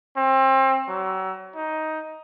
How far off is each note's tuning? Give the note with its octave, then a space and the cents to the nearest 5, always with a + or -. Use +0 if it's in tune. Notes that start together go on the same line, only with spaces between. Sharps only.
C4 +30
F#3 +35
D#4 +10